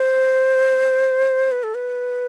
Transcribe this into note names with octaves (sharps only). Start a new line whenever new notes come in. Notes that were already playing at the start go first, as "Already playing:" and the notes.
Already playing: C5
B4
A4
B4